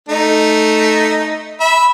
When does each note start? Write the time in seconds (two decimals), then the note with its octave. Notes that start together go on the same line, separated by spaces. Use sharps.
0.09 A3 D#4
1.60 E5 B5